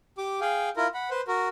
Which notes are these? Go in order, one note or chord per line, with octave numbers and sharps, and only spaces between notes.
G4 D6
G#4 F5 G5
E4 F4 A#4
F#5 B5
B4 C5
F#4 A#4